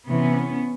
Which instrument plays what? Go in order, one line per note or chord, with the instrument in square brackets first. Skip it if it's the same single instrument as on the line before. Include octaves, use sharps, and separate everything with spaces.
[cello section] C3 E3 B3 C#4